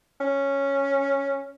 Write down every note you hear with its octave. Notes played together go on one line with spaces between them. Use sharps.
C#4